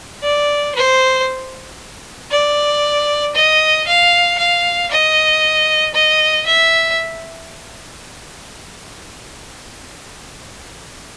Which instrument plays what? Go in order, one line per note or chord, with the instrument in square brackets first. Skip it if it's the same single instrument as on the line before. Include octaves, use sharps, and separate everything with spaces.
[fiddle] D5
C5
D5
D#5
F5
F5
D#5
D#5
E5